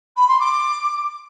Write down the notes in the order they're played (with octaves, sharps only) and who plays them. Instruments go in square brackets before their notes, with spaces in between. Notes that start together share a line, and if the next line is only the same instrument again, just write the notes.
[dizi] B5
C6
D6